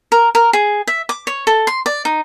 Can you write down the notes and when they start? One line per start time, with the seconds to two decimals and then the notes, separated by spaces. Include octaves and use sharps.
0.12 A#4
0.35 A#4
0.53 G#4
0.87 E5
1.09 D6
1.27 C#5
1.47 A4
1.67 C6
1.86 D5
2.05 D#4